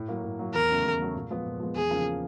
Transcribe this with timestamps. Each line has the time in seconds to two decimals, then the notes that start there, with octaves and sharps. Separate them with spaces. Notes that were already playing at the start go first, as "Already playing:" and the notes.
Already playing: A2
0.08 F#3 A#3
0.24 A2
0.39 F#3 A#3
0.54 E2 A#4
0.70 C#3 F#3 A3
0.85 E2
1.00 C#3 F#3 A3
1.15 A#2
1.30 F3 G#3 B3
1.46 A#2
1.60 F3 G#3 B3
1.76 E2 G#4
1.90 C#3 F3 A#3